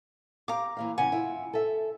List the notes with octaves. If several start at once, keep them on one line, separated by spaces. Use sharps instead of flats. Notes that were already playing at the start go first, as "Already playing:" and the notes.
G4 F5 A#5 D6
E3 A#3 F5
C#3 E3 F#5 G#5
E4 F4
A4 E5